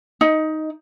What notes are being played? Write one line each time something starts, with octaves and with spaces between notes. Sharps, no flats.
D#4